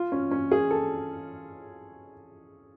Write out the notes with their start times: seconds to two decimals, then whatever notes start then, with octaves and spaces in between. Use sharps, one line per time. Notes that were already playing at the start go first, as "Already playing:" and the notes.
Already playing: F4
0.12 C#4
0.31 C#4
0.51 G#4
0.71 A4